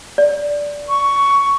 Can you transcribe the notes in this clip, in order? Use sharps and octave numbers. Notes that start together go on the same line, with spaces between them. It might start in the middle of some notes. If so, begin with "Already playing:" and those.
D5
C#6